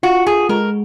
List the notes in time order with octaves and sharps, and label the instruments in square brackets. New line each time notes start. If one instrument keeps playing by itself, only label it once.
[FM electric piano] F4 [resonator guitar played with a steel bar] F#4
[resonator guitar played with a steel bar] G#4
[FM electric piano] G#3 [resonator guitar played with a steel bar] A#4